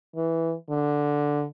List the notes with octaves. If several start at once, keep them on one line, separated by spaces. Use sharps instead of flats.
E3
D3